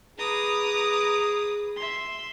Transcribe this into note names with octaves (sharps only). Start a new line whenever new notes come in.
G#4 B4 A#5 D6 D#6
E5 C6